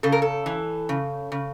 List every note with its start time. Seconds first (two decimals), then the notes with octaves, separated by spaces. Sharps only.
0.03 C#3 A4
0.12 A#4
0.22 A4
0.46 E3
0.89 C#3
1.32 C#3